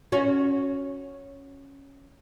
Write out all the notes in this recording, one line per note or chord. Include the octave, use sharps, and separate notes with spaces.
C#4 F#4